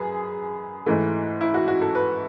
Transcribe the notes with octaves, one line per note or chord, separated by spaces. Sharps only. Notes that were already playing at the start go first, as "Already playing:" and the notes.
Already playing: F#2 G#4 B4
G#2 E3 A3
E4
F#4
F#4
A4
B4